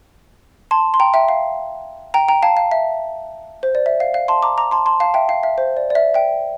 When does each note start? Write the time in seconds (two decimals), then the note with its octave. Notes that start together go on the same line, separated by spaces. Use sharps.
0.71 A5 C6
0.94 C6
1.00 G5 A#5
1.14 E5 G5
1.29 F5
2.14 G5 A#5
2.28 G5 A#5
2.43 F5 A5
2.57 F5
2.71 E5
3.63 C5
3.75 D5
3.86 E5
4.00 F5
4.14 F5
4.28 A5 C6
4.43 A#5 D6
4.58 A#5 D6
4.71 A5 C6
4.86 A5 C6
5.00 F5 A5
5.14 E5 G5
5.29 F5
5.43 E5
5.58 C5
5.77 D5
5.90 D5
5.95 E5
6.14 E5 G5